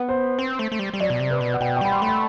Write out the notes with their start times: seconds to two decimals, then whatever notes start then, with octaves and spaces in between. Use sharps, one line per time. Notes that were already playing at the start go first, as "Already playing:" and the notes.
Already playing: B3
0.09 C5
0.39 C4
0.59 A3
0.72 A3
0.79 G3
0.94 G3
1.00 F#3 D5
1.10 B2
1.20 C3
1.31 B4
1.41 B2
1.54 F#5
1.61 B2 G5
1.76 G5
1.81 G3 B5
1.91 C6
2.02 A3 B5